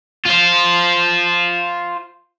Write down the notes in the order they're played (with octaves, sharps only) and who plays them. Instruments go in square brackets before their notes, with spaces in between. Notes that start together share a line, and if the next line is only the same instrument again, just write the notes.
[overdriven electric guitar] F4 C5